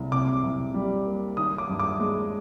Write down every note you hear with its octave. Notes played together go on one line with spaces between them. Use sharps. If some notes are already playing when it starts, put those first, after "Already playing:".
Already playing: C2
C3 D6
C2
G3
A#3
D#3 D#6
D6
G2
D6
G#3